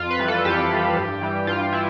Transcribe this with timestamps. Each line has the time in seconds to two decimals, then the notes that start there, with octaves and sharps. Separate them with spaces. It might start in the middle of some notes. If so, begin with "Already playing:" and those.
Already playing: F2 F4
0.11 B4
0.19 E3 G3
0.28 A4
0.45 F2 G4
0.70 E3 G3
0.97 G2
1.21 E3 G3
1.47 G2 F4
1.73 E3 E4